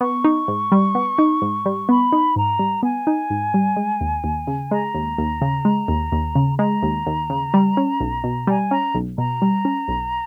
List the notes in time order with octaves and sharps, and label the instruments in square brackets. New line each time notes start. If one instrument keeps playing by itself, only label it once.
[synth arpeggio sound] B3 [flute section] C#6
[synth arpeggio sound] D#4
G#2
G3
B3
D#4
G#2
G3
[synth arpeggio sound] B3 [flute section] B5
[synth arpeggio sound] D#4
[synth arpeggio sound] G#2 [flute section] A#5
[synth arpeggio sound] G3
[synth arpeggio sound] B3 [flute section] G#5
[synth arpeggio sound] D#4
G#2
G3
G#3
D#2
D#2
C#3
[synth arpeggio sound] G#3 [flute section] A#5
[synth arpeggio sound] D#2
D#2
C#3
G#3
D#2
D#2
C#3
[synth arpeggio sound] G#3 [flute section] A#5
[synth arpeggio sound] D#2
D#2
C#3
G3
C#4
B1
B2
[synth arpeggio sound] G3 [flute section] G#5
[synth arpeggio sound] C#4 [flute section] A#5
[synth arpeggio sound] B1
[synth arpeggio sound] B2 [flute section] A#5
[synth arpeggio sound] G3
C#4
B1